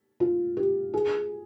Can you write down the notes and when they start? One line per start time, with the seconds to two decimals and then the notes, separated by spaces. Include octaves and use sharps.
0.20 F4
0.57 G4
0.94 G#4